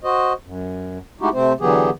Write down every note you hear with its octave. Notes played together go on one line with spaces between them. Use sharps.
F#4 C5 D#5
F#2
G#3 A3 D#4 E4 F#4 G4
C3 A3 C4 C5
D3 E3 F#3 B3 G4 G#4